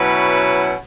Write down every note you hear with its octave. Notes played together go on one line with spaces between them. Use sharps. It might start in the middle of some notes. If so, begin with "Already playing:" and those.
Already playing: B2 F#3 C#4 E4 B4